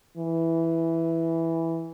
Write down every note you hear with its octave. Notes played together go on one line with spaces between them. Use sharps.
E3